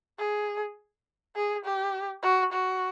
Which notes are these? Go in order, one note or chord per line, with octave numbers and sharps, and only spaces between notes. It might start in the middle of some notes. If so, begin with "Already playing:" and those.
G#4
G#4
G4
F#4
F#4